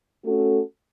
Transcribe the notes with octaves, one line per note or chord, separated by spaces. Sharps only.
A3 C#4 F#4 A4